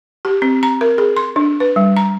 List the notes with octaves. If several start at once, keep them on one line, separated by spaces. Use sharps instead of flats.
G4
C4
A#5
A#4
G#4
C6
D4
B4
G3
A#5